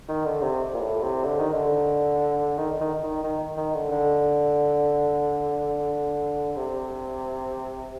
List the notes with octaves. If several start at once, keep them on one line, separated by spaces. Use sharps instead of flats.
D#3
D3
C3
A#2
A2
C3
D3
D#3
D3
D#3
D#3
D#3
D#3
D#3
D3
D3
C3